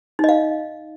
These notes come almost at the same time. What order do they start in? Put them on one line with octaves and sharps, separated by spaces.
D#4 D#5 F5